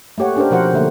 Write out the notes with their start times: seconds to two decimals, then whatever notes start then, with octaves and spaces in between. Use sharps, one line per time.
0.18 A3 A#3 G4 C#5 F#5
0.36 C#4 D4 G4 A4 A#4 C5
0.51 B2 F3 F#4 A#4 C5 F#5
0.73 D3 A3 A#3